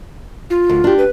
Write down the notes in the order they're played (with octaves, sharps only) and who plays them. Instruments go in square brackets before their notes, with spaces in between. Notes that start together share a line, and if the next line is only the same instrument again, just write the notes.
[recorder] F4
[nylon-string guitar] D2
D4 G4
[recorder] B4